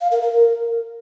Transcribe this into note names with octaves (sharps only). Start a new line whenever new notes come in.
F5
A#4
A#4